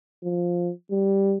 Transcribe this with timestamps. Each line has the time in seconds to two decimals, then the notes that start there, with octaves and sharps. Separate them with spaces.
0.24 F3
0.92 G3